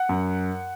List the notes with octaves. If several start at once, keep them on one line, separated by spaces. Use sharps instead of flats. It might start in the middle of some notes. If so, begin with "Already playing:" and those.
Already playing: F#5
F#2